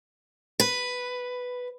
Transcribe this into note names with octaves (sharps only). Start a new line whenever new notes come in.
B4